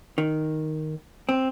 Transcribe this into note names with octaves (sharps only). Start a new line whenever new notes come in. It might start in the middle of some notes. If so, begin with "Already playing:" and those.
D#3
C4